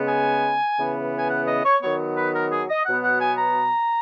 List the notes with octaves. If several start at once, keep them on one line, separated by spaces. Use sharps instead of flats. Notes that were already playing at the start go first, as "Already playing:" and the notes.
Already playing: C#3 G#3 B3
G#5
C#3 E3 B3
G#5
F#5
D#5
C#5
D#3 F#3 B3 C#5
B4
A#4
G#4
D#5
B2 F#3 B3 F#5
F#5
G#5
A#5